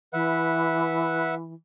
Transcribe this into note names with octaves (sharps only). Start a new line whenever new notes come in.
E3 B4 E5 F#5